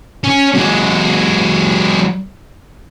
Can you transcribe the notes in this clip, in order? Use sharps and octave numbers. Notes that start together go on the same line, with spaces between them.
C#4
F#3 G#3